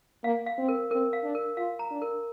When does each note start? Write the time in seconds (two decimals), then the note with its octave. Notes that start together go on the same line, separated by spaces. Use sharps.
0.24 A#3 F5
0.46 F5
0.58 C4
0.68 A#4
0.91 C4 A#4
1.13 F5
1.23 D4
1.35 A#4
1.57 F4 F5
1.79 A#5
1.91 D4
2.02 A#4